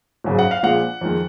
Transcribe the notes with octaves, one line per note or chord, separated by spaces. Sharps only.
G#1 F#2 C#3
F#5
F5
A#1 A#2 G#3 F#5
F2 D#3 G#3